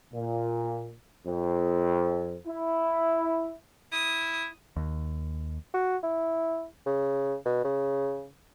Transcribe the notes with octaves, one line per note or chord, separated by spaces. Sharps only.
A#2
F2
E4
E4 D#6
D#2
F#4
E4
C#3
B2
C#3